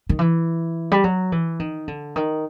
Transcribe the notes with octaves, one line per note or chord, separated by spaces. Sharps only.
D#3
E3
G3
F#3
E3
D#3
D3
D#3